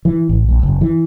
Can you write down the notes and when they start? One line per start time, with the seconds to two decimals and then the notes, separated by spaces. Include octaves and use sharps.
0.05 E3
0.29 A1
0.48 A#1
0.63 F#1
0.81 E3